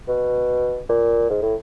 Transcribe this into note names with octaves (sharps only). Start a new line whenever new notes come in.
B2
A#2
G#2
A2